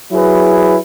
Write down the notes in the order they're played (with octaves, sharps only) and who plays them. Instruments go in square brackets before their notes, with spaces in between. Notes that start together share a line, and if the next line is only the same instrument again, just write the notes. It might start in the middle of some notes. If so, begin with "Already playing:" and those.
[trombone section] F#3 E4 G#4 B4